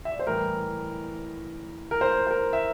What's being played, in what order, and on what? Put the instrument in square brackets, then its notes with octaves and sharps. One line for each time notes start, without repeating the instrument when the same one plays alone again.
[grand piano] E5
D5
C5
A2 E3 G3 A#4
A#4
C5
C5
A#4
E5